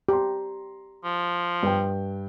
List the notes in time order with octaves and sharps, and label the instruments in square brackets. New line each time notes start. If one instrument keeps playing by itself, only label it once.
[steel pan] G4 [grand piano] A#5 C6
[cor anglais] F3
[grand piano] G2 G5